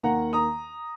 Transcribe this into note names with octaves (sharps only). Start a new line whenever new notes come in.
D#2 D#3 A#3 F#5 A#5
A#5 D#6